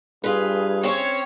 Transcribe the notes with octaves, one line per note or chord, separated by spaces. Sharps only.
G2 F4 G#4 B4
C4 C#4 C#5